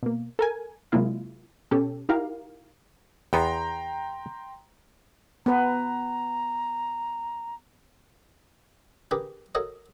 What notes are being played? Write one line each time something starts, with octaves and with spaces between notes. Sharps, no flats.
B2 A#3
A4 A#4 G#5
C3 F#3 G#3 A#3 E4 F4
B2 C#4 G4 A4
D#4 E4 F#4 G4 A#4 F5
E2 B3 G5 A#5 C6
B3 B4 A#5
D4 G4 G#4 A#4 B4
F#4 A4 A#4 C#5 D#5